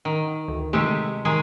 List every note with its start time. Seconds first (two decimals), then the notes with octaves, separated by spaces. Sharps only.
0.05 D#3
0.48 D2
0.73 C3 D#3 G#3 A3 G4
1.25 D#3 G#3 G#4